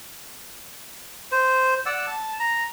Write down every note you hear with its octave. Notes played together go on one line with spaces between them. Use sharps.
C5
D5 F#5 E6
A5
A#5